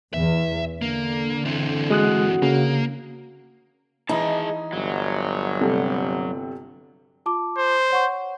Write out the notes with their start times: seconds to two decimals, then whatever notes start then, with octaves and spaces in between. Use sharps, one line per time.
0.14 E2 E5
0.82 D3 A#3
1.45 E3 C4
1.90 G#3 F#4 D#6 F#6
2.42 C#3 A#3
4.09 E3 D#4 E4 G#4 D#5 A5
4.73 G1 F#3
5.61 C3 G3 A3
7.26 F4 A5 D6
7.58 C5
7.90 C#5 F#5 C#6